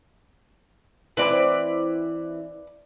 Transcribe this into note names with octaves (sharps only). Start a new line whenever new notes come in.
E3 C4 E4 B4 D5 B5